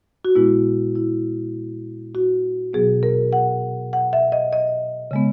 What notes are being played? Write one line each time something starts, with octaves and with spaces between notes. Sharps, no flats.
F#4
A#2 G#3 B3 E4
E4
F#4
B2 F#3 B3 G#4
A#4
F#5
F#5
E5
D#5
D#5
C#3 G#3 B3